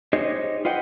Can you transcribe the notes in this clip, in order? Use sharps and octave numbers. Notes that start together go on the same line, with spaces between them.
D#4 G4 G#4 C5 C#5 D#5
F4 B4 D#5 F#5 G5